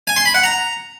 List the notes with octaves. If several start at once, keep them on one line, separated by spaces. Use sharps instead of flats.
G#5
C6
B5
F#5
A#5